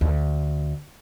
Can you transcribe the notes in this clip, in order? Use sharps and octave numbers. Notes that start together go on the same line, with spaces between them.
D2